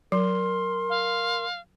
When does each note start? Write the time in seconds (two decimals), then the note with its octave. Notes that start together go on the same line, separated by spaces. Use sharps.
0.12 F#3 A#4 C6
0.90 F5